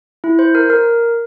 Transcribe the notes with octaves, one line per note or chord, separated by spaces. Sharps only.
E4
C5
A#4
A#4